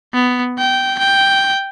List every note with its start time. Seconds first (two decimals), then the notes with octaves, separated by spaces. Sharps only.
0.14 B3
0.58 G5
0.99 G5